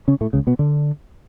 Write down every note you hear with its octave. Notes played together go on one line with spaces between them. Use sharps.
C#3 C#4
A2 A3
C#2 C#3
B2 B3
D3 D4